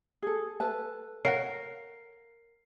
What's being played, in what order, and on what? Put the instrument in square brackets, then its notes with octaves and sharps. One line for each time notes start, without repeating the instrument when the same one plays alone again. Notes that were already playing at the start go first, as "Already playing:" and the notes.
[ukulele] G#4 A4
A4 B4 A5
[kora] A#4 [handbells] C#5 F5 F#5 [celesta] C7